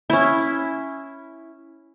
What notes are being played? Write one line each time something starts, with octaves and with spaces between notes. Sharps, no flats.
C#4 E4